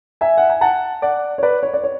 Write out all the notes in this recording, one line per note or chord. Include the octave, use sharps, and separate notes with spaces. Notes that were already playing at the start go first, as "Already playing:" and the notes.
E5 G#5
F#5
G#5
F#5 A5
D5 F#5
C#5
B4 D5
C#5
D5
C#5